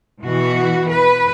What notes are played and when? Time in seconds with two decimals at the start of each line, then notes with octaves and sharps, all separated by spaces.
0.22 B2 E3 F#4
0.91 B4